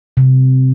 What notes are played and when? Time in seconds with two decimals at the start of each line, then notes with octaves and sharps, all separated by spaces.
0.17 C3